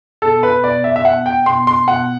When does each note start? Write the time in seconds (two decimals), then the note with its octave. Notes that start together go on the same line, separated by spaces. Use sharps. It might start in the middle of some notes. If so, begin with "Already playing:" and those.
0.22 B2 A4
0.43 B4
0.63 B2 D5
0.84 E5
0.96 E5
1.05 B2 F#5
1.26 G5
1.46 B2 C6
1.67 C6
1.88 B2 F#5